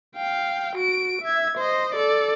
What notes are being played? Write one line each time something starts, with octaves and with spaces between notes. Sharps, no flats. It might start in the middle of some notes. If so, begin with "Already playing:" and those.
F5 G5
F#4 D7
E5 G#6
C5 D#5
A4 D5